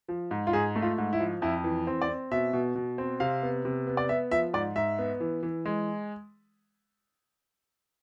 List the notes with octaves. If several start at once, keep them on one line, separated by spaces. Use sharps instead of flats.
F3
G#2
F4
G#2 G#4
A3
F4
G#2
E4
F3
F2 E4
E3
C4
D5
C4
B2 E5
B2
B2
C4
C3 F5
B3
C3
B3
D5
B3 E5
F3 E5
G#2 D5
G#2 E5
B3
E3
E3
G#3